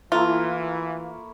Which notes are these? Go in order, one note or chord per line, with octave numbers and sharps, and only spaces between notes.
E3 A3 A#3 E4 F4